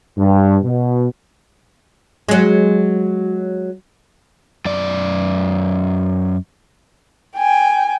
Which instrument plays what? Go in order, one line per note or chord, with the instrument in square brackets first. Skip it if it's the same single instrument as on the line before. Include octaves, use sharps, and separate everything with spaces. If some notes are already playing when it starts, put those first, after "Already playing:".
[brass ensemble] G2
B2
[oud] F#3 G#3
[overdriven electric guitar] F#2 D5
[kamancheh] G5 G#5